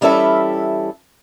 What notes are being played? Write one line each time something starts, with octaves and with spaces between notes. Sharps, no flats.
E3 G3 C#4 E4 A4 E5